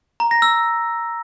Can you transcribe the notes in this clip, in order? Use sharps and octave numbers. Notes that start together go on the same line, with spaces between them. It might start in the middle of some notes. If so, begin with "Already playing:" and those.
A#5
A#6
E6